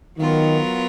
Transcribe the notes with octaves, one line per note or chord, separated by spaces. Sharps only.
D#3 F#3 B3 F4 A#4